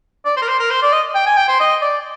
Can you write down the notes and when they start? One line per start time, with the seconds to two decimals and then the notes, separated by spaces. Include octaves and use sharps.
0.25 D5
0.37 C5
0.42 A#4
0.48 C5
0.59 A#4
0.71 C5
0.82 D5
0.92 D#5
1.15 G5
1.26 G#5
1.37 G5
1.48 C5
1.60 D#5
1.82 D5